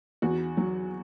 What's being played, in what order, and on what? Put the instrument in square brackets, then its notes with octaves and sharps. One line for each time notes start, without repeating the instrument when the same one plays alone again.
[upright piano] E2 F#4
F#3